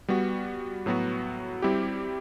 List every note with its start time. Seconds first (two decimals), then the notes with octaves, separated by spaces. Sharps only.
0.08 G3 B3 F#4
0.86 A2 F#3 B3 F#4
1.62 G3 C4 E4 G4